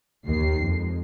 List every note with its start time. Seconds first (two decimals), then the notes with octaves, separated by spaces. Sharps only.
0.25 D#2 D#3 C7
0.61 F2 G#3